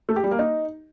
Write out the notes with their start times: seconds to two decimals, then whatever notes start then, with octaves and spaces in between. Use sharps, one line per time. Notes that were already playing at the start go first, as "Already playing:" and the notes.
0.09 A3
0.16 G4
0.24 G3
0.31 A#3
0.39 D#4